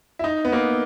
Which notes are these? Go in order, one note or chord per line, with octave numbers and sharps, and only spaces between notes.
E4
D#4
B3
A#3